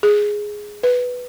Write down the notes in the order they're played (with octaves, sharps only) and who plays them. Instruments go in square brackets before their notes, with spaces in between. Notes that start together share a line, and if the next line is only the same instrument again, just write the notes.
[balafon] G#4
B4